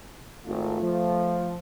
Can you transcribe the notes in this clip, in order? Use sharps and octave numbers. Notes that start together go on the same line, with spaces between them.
G#1 A3 F4
F3